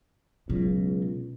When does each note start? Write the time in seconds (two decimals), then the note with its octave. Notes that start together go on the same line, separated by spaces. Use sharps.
0.50 C#2 B2 F#3